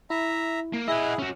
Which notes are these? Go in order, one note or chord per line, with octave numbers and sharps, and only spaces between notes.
E4 E5 A#5
A#3
E4 G#4 D#5 E5 F#5
C#4 F#4